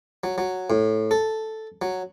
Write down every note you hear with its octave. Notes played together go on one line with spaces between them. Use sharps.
F#3
F#3
A2
A4
F#3